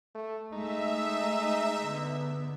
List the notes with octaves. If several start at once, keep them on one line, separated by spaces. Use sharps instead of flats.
A3
G#3 A3 D#4 E5
D3 B3